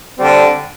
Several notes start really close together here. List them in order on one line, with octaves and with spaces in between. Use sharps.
C4 G3 D3